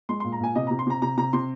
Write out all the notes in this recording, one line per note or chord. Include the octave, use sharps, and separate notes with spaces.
G#3 C6
A#2 C6
A#5
A#2 G#5
C3 D#5
C3 A#5
C6
C3 A#5
C3 A#5
C3 A#5
C3 C6